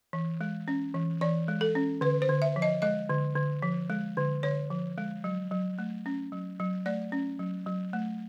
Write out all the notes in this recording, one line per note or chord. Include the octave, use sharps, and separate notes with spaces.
E3
G#3
C#4
E3
E3 D5
G#3
A4
C#4
D3 B4
C5
D3
E5
F3
D#5
G#3 D#5
D3
D3
F3
G#3
D3
D3 C#5
F3
G#3
F#3
F#3
A3
C#4
F#3
F#3
A3 D5
C#4
F#3
F#3
A3